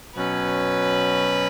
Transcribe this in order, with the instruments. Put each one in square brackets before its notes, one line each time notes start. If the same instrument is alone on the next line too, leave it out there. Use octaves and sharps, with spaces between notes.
[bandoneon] B2 F#3 C#4 [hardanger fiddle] B4